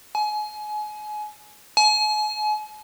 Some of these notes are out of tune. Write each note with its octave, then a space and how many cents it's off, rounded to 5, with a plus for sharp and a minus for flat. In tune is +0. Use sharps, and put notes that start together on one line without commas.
G#5 +30
G#5 +40